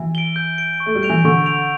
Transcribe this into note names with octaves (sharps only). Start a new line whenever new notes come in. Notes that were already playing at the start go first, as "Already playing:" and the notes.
Already playing: E3
D7 G7
G6
D7 G7
C#6
A3
G3
G6 D7 F7
E3
D3 C#6
G6 D7 F7